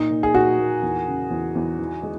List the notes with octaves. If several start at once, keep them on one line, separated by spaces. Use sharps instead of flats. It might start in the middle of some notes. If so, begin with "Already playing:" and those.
Already playing: A#2 D#4
A#2
G#4
A#2 F#4
A#3
E2
C#3
E2
E2
E3
G#3